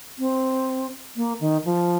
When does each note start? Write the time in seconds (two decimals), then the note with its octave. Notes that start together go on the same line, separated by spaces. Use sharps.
0.19 C4
1.16 A#3
1.40 D#3
1.65 F3